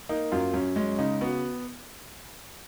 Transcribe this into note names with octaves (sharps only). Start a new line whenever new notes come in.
A#3 D#4
F#2 F4
F#2 C#4
G#3 C#4
C#3 D#4
B3 F#4